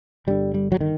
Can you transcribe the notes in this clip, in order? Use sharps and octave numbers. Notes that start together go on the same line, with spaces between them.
G1 G2 D3 G3
G3
F#3
D#3